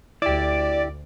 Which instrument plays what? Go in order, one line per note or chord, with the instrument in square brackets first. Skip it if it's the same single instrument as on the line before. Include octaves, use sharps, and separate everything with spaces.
[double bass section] D2 [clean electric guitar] E4 G4 [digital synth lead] D5